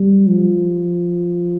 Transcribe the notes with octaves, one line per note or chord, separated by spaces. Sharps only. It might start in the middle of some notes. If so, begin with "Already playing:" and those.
Already playing: G3
F3